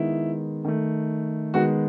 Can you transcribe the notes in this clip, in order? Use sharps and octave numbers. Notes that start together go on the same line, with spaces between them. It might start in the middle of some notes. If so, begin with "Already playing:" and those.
Already playing: D#3 G#3 B3 E4
D#3 A3
D#3 G#3 B3 F#4